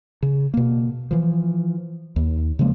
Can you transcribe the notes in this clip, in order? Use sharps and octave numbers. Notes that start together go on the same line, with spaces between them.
C#3
B2 A#3
E3 F3
D#2
C#3 F3 G#3 A#3